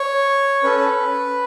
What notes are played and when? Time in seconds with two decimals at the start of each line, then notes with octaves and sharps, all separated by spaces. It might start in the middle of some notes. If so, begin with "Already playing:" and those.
Already playing: C#5
0.63 C#4 A4 B4